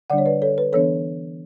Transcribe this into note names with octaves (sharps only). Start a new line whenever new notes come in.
D3 G3 D4 D5 F#5
C#5
B4 D5
A4 C#5
B4
E3 B3 D4 A4 C#5